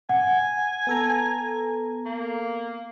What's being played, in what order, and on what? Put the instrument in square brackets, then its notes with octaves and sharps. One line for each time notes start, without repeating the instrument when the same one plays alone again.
[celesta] F#5 [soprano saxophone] G#5
[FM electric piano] B3 A4 A#5
[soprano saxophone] A#3